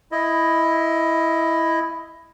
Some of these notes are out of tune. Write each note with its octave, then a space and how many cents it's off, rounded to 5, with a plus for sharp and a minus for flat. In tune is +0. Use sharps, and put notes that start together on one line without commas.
E4 +0 D#5 +10